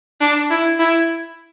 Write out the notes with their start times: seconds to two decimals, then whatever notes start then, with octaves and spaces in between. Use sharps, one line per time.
0.21 D4
0.50 E4
0.79 E4